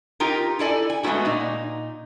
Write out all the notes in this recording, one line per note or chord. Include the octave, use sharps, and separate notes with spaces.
D#4 F4 G4 A#4
E4 A4 D5 G#5
G#5
G#3 A3 B3 E4 F#4
A#2 D#4